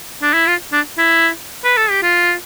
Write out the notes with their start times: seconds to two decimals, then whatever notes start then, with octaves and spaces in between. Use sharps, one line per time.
0.22 D4
0.34 E4
0.47 F4
0.72 D4
0.98 E4
1.64 B4
1.77 A4
1.90 G4
2.02 F4